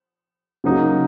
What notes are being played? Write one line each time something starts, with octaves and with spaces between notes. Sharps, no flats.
C#3 F#3 A#3 D#4